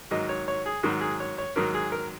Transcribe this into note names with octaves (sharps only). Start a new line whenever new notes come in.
G#2 D#3 F#3 D#5
C#5
C#5
G#4
G#2 D#3 F#3 F#4
G#4
C#5
C#5
G#2 D#3 F#3 A#4
G#4
A#4